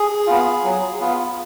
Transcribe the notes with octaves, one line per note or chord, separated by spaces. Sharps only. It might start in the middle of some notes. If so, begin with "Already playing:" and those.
Already playing: G#4
B3 F4
F#3
B3 F4